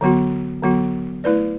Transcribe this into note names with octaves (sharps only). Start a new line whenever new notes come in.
D3 F#3 B3 F#4
D3 F#3 B3 F#4
A3 E4 B4 D5